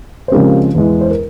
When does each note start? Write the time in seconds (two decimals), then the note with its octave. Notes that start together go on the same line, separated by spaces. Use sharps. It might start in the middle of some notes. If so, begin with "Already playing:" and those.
0.28 C5
0.32 C#3 F3 G#3 C4 G4 A#4
0.75 E2 E3 G#3 E4
1.01 C5
1.10 A#4